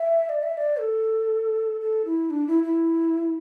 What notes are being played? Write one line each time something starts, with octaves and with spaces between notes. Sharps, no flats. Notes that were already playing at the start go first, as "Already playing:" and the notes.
Already playing: E5
D5
E5
D5
A4
A4
E4
D4
E4
E4